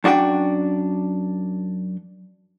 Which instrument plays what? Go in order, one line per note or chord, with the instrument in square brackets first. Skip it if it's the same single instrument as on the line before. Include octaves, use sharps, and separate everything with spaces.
[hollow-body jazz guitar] F#2 D4 F#4 G4 G5